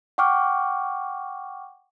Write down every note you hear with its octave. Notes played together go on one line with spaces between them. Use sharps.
F#5 G5 C#6 D6 F6